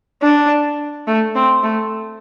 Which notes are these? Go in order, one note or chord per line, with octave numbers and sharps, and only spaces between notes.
D4
A3
C4
A3